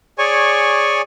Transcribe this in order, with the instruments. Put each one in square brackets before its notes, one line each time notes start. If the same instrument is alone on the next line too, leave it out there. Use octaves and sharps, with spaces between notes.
[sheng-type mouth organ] G#4 C#5 D5 G#5 C#6